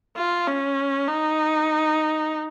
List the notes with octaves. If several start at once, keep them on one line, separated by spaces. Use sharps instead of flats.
F4
C#4
D#4